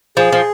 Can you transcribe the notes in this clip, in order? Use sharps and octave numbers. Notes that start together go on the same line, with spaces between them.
F3 G#4
F3